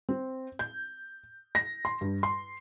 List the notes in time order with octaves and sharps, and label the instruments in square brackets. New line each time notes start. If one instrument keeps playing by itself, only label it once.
[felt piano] C4
G6
A#6
C6
G2
C6